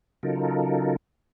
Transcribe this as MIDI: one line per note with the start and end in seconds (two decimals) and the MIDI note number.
0.23 0.96 49
0.23 0.96 54
0.23 0.96 63
0.23 0.96 65
0.23 0.96 69
0.23 0.96 70